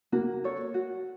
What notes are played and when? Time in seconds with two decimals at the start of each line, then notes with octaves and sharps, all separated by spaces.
0.12 A#3 F#4
0.44 A4 C#5
0.74 F#4